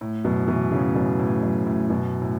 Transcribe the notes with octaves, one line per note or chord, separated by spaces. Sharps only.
A2
F#2 B2
B2 E3
A2 C#3
F#2 B2
A2
F#2
A2
F#2 B2
A2